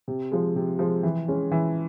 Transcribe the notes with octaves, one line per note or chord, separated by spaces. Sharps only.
C3
F3 G#3
C3
F3 G#3
E3
G#3 C#4
E3